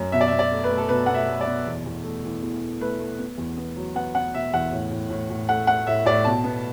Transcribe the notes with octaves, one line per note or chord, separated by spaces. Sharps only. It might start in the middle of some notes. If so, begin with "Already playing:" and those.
Already playing: F#2
B2 E5
D5
E5
B2
D5
A3
B4
A3
A4
B2 B4
B2 F#5
E5
A3
D5
B2
E2
E2
A3
E3
E2
A3
A3 B4
A3
B3
E2
B3
F#3
B3 F#5
B3 F#5
B2 E5
E2 F#5
A2
A2
A2
A2
A3 F#5
A3 F#5
A2 E5
A2 D5
B2 A5
B3